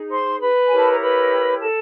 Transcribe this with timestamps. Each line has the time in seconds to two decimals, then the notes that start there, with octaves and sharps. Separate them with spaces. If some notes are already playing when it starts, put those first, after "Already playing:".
Already playing: D#4 G#4
0.10 C5 C6
0.40 B4 B5
0.66 E4 G4 A#4 C#5 G#5
0.77 A5
0.89 A#5
0.99 B4 B5
1.60 A4 A5